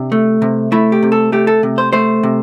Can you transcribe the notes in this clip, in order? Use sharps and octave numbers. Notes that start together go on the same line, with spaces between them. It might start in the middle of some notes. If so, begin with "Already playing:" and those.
Already playing: C3 D4
A3
C3
A3 E4
G4
C3
A4
A3 G4
A4
C3
C5
A3 C5
C3